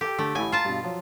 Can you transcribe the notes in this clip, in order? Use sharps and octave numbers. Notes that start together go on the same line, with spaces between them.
G4 A4 G5
D3 A3
A1 E4 G#5
F4 A5 A#5
G2 B2
F3 F#3